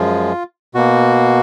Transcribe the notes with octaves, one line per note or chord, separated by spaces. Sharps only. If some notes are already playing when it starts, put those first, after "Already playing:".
Already playing: F#2 F3 G#3 F4
B2 A#3 F#4